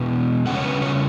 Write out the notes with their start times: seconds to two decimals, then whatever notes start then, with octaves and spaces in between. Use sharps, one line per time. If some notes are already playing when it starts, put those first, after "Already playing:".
Already playing: E2 B2
0.47 C#3 G3 C#4 F#5
0.56 C#5
0.64 B4
0.82 C#5